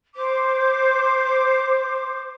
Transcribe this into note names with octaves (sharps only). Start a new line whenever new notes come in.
C5 D6